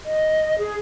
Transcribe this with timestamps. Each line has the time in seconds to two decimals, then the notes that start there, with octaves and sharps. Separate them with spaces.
0.05 D#5
0.58 G#4